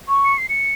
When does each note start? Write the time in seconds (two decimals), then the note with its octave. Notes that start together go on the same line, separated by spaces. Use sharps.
0.09 C#6
0.25 C#7
0.38 C7
0.49 C#7